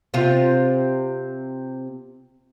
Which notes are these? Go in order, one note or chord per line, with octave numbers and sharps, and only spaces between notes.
C3 F4